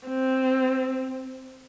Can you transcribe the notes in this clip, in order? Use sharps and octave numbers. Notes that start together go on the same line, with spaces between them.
C4